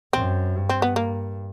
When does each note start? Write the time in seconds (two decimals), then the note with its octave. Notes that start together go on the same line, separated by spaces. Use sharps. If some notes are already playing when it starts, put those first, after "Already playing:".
0.13 F#2 C4
0.56 G2
0.69 C4
0.82 B3
0.96 A#3